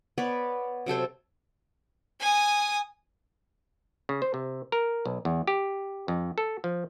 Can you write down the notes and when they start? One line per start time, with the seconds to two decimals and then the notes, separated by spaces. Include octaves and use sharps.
0.18 B3 B4 C#5 D5
0.86 C3 F#3 A4 C5
2.20 G#5 D#6
4.09 C#3
4.22 C5
4.34 C3
4.72 A#4
5.06 B1
5.25 E2
5.48 G4
6.08 F2
6.38 A4
6.64 F3